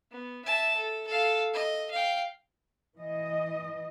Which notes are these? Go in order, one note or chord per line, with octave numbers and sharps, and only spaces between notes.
B3
E5 A5
A4
A4 F5
D#5
F5 G5
E3 D#5